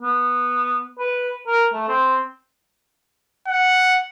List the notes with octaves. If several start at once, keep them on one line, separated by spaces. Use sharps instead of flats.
B3
B4
A#4
A3
C4
F#5